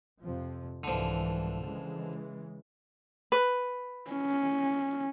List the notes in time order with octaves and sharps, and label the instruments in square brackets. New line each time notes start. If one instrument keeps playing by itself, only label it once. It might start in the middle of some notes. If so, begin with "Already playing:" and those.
[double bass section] F2 C3 F3
[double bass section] C2 G#2 E3 [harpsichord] D3 F3
[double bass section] C#3 E3 G#3
[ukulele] B4
[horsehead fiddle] C#4